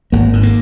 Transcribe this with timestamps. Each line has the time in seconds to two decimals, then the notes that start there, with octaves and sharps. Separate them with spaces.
0.12 G#1 A#3
0.33 G#2
0.43 A#3